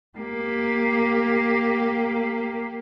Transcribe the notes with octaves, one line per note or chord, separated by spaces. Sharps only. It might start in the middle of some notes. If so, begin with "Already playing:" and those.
A#3 G4